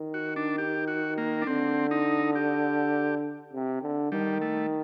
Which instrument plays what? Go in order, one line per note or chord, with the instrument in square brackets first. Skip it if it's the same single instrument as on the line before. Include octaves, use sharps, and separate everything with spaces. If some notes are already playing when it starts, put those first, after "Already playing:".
Already playing: [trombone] D#3
[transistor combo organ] F#4
D4
G4
F#4
A#3
D4
[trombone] D3 [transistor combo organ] C4
[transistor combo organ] D#4
G4
[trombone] C3
D3
[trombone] D#3 [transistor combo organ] G3
[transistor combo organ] A3